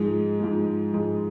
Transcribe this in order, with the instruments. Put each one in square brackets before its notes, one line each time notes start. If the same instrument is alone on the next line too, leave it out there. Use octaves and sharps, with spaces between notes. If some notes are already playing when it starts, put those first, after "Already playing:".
Already playing: [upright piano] G#2 F3 G#3
G#2 F3 G#3
G#2 F3 G#3